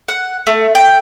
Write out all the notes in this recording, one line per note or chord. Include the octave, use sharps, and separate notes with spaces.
F#5
A3
G5